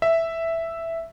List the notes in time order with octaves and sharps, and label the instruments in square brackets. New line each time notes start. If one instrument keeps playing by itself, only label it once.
[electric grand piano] E5